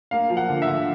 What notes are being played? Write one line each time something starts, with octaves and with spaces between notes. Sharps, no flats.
A#3 F5
F3
F#5
D3
E5
D3